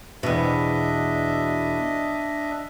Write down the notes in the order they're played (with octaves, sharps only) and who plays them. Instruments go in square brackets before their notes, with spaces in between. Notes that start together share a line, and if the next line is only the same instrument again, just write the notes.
[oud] E2 B2 [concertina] D4 D#5 E5